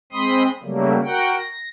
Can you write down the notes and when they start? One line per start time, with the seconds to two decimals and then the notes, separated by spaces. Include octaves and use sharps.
0.12 G#3 C4 B5 C6 D#6
0.63 C#3 F#3 G3 A3 A#3
1.03 F#4 A#4 F#5 G5
1.37 A#6